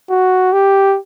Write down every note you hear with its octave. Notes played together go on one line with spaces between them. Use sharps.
F#4
G4